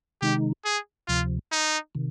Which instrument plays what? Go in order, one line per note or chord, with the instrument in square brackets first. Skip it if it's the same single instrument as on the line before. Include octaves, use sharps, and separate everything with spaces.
[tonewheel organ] C3 D#3 G#3 D#4 [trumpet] G4
[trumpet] G#4
[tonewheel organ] D2 C3 F3 [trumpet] F4
[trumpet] D#4
[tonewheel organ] C3 D#3